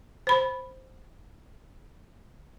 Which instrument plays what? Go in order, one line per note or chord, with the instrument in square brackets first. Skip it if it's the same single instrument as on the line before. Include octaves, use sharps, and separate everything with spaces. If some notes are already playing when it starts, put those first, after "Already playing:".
[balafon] C5 B5